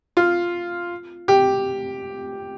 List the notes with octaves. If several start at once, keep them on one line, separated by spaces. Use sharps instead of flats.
F4
G4